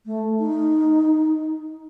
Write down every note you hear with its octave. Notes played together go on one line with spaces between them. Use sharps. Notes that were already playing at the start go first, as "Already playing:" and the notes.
A3
D#4